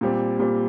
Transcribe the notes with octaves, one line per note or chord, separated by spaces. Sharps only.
A#2 G3 C4
A#2 G3 C4